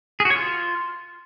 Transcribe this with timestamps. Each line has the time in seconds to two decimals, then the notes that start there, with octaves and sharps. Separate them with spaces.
0.20 G#4
0.25 F#4
0.30 C#5
0.36 F4